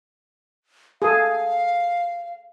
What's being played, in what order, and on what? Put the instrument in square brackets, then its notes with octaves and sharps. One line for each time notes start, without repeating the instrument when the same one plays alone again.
[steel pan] G#4 A4 [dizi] F5